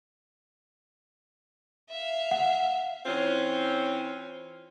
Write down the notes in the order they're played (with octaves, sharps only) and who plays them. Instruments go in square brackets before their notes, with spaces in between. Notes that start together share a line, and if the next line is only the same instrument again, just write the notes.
[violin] E5 F5
[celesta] F#5
[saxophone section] E3 C4 C#4 F4